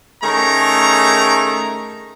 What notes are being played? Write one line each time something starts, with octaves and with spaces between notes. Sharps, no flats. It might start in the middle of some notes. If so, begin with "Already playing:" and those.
D#3 A3 C#4 G#4 A#5